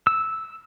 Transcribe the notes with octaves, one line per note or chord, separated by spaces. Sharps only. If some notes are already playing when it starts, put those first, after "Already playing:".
E6